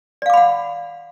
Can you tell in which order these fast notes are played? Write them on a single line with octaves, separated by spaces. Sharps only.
D5 F5 D6 B5 F#5